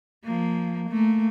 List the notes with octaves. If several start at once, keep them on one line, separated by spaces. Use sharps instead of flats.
F3 A#3
A3 A#3